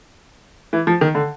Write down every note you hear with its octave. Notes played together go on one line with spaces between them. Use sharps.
E3
F3
D#3
D3